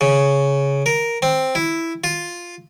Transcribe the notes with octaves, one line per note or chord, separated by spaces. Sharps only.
C#3
A#4
C4
E4
F4